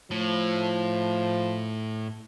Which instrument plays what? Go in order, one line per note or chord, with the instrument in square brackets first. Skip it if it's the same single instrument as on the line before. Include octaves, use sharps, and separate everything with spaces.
[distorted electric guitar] A2 [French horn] F3